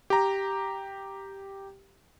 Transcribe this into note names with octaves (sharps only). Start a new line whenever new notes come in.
G4 A#5